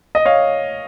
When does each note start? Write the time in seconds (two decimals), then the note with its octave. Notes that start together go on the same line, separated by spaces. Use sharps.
0.15 D#5
0.25 C#5 F5